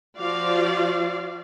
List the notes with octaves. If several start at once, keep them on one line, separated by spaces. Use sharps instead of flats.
F3 F4 F#4 D5 F5